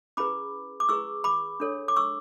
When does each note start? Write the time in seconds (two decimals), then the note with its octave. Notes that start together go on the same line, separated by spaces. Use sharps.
0.17 C#4 E4 G#4 B4 B5 D6
0.80 D6
0.89 E4 G#4 B4 C#6 E6
1.24 B5 D6
1.60 D4 A4 C#5
1.88 D6
1.96 C#6 E6